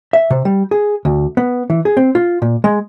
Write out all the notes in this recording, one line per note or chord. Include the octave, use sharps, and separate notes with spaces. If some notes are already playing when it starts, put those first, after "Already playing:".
E5
C3
G3
G#4
D2
B3
E3
G#4
C4
F4
A#2
G#3